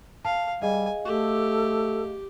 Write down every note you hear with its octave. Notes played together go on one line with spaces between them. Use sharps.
F5 A5
G3 G#4 D#5 F5 G#5
A3 G4 A4